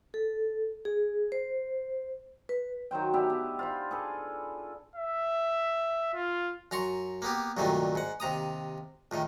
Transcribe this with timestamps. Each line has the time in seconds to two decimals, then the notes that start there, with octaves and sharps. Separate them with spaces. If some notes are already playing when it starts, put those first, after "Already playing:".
0.14 A4
0.85 G#4
1.32 C5
2.49 B4
2.91 D#3 F#3 C5 G5
3.14 B3 D4 G4 E5
3.30 B3
3.59 F4 C5 B5
3.91 G#4 A4 B4
4.96 E5
6.14 F4
6.71 F#2 A#5 C6 C#6
7.22 A#3 B3 G4
7.57 C2 G2 A#2 D#3 F#3 A3
7.95 G#2 F#5
8.20 D#2 C3 A#5 D#6
9.11 C#2 A2 D#3